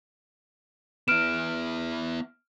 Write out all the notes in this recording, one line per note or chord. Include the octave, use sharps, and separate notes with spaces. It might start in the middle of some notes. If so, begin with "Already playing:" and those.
B3 E4 F6 D7 E7